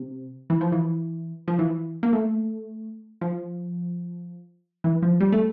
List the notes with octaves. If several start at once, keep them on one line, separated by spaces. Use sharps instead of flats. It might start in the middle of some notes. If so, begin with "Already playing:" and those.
Already playing: C3
E3
F3
E3
F3
E3
A#3
A3
F3
E3
F3
G3
A3